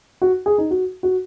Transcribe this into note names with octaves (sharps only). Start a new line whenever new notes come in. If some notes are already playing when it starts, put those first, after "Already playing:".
F#4
G#4
D#4
F#4
F#4